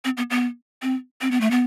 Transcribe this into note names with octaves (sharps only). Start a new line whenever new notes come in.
C4
B3
B3
C4
C4
B3
A3
B3